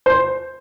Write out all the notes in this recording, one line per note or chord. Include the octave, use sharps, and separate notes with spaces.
C5